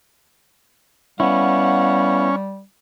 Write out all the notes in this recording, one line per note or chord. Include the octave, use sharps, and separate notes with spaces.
G3 B3 C#4 E4 F5 F#5